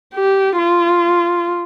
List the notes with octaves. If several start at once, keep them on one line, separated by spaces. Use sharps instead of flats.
G4
F4